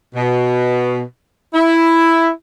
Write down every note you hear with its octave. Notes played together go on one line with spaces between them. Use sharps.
B2
E4